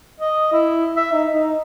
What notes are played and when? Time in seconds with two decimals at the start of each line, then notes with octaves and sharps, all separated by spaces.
0.20 D#5
0.52 E4
0.96 E5
1.13 D#4
1.31 D#4